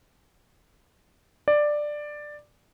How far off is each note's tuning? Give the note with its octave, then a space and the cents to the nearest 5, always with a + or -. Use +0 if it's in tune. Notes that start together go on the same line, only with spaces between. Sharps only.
D5 +10